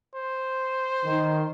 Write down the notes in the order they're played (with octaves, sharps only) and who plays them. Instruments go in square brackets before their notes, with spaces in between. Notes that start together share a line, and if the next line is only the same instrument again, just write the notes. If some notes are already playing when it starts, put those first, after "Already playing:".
[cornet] C5
[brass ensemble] D#3